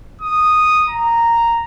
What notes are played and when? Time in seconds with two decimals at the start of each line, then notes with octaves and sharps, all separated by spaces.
0.22 D#6
0.90 A#5